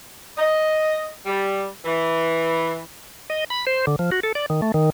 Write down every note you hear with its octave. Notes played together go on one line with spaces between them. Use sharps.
D#5
G3
E3
D#5
B5
C5
D3
F3
F#4
A4
D5
D#3
A3
D#3